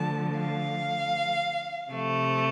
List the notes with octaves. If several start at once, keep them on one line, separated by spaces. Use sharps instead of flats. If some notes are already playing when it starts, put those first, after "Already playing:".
Already playing: D3 F3 A3 A5
F5
C3 F3 A3